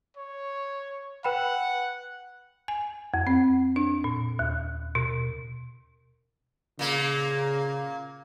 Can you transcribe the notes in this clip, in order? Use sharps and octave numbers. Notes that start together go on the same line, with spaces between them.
C#5
B4 F#5 G5 B5
G#5
F2
C4
D4
A#2
D#2
B2
A#2 C#3 A#3